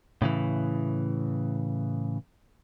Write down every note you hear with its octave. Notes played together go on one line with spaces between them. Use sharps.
A2 C#3 E3